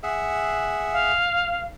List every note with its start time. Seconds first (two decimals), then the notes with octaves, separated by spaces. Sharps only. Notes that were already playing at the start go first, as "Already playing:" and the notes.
0.03 G#4 E5 F#5
0.93 F5